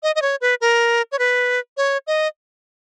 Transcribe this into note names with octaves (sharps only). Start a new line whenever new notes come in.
D#5
D#5
C#5
B4
A#4
C#5
B4
C#5
D#5